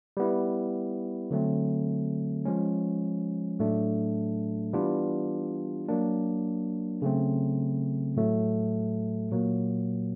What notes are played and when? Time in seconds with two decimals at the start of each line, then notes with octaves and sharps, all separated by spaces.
0.17 G3 B3 E4
1.31 D3 F#3 A3 C4
2.45 F3 G#3 C#4
3.59 A2 F#3 A3 D4
4.73 E3 G3 B3 D4 F4
5.88 F#3 A#3 D4
7.02 C#3 F#3 A3 C4
8.16 A2 F#3 A3
9.31 A#2 F#3 A#3